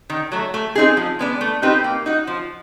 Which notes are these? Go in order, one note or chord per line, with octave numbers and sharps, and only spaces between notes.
D#3
F#3 A3
A3
C4 D#4 G#4
F3
G#3 B3 D4
A3
C4 D#4 G4 B4
A#3
D#4 F#4
F3